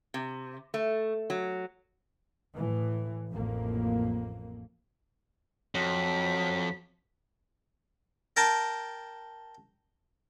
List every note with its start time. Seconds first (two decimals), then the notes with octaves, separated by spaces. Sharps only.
0.14 C3
0.74 A3
1.30 F#3
2.56 A2 E3
3.31 A1 F2 A#3
5.75 F2 F#3 B6
8.37 A#4 G5 A5 A#5